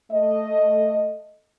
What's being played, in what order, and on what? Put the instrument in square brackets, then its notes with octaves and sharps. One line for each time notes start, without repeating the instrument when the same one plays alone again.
[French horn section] A3 D#5